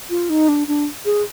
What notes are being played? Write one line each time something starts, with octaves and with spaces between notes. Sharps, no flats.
F4
D#4
D4
D4
G#4